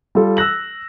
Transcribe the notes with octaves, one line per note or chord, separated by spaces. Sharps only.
G3 F4 A4
E6 F#6 A#6 F#7